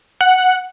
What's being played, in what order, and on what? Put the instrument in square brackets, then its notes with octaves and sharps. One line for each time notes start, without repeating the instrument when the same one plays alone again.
[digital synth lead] F#5